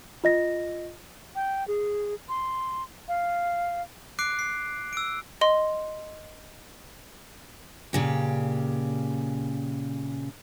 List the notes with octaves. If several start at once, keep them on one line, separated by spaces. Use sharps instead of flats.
F4 D#5 A#6
G5
G#4
C6
F5
D6 F#6 C7 D7
C7
E6 D7
D#5 C6
A#2 C#3 G4